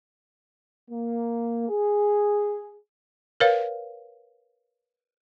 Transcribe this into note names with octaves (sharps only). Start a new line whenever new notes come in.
A#3
G#4
A#4 B4 C#5 F5